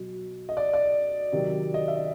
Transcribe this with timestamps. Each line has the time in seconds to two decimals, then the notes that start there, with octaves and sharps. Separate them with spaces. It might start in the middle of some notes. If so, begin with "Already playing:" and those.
Already playing: B2 F#3
0.49 D#5
0.57 D5
0.74 D5
1.32 C3 D#3 F#3
1.74 D#5
1.88 E5
1.95 D#5